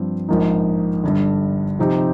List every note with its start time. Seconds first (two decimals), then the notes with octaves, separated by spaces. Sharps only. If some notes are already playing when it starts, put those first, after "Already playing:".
Already playing: G2 F3 C4
0.29 A#1 G#2 F3 A#3 D#4
1.04 G1 G2 D3
1.79 C3 F3 C4 D#4 G4